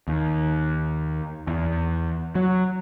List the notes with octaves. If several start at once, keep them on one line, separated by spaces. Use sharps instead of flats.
D#2
E2
F#3